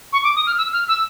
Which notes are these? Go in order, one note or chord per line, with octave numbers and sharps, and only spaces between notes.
C#6
D6
D#6
F6
E6
F6
E6